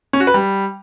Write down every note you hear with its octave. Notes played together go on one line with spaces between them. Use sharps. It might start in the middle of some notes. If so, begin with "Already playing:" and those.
C#4
F#4
B4
G3